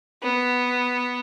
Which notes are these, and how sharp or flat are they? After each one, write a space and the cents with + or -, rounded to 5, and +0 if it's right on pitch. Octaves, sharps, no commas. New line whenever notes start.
B3 +0